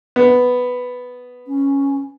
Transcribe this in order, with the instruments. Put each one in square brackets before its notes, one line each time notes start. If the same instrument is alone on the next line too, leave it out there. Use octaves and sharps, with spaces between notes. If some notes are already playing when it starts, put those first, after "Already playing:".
[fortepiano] B3
[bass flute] C#4